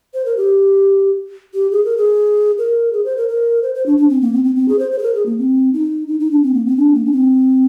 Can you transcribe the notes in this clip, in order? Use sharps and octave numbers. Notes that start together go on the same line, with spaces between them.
C5
A#4
G4
G4
G#4
A#4
G#4
A#4
G#4
C5
A#4
A#4
C5
C5
D4
D4
C4
A#3
C4
C4
C4
G#4
C5
C5
G#4
A#4
G#4
A#3
C4
D#4
D#4
D#4
D4
C4
A#3
C4
D4
A#3
D4
C4